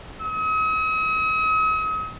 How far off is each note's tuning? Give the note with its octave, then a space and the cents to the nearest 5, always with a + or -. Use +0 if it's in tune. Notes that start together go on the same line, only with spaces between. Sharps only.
D#6 +45